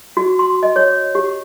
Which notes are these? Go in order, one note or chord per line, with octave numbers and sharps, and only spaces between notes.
F#4
C6
D#5
C#5
G4